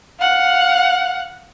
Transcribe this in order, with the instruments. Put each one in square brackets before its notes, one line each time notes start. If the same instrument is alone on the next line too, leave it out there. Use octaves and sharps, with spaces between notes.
[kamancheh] F5 F#5